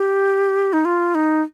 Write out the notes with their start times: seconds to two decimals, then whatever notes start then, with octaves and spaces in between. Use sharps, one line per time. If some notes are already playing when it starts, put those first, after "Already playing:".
Already playing: G4
0.73 D#4
0.85 F4
1.15 D#4